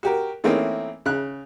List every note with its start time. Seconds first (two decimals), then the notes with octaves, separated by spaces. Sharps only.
0.03 F#4 G4 A#4
0.44 E3 A3 A#3 C4 C#4 D#4
1.06 C#3 F#6